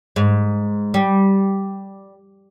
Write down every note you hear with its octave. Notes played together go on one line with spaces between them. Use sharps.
G#2
G3